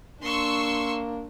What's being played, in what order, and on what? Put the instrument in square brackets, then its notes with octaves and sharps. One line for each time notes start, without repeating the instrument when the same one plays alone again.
[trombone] A#3 [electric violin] D4 [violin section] C6 C#6 E6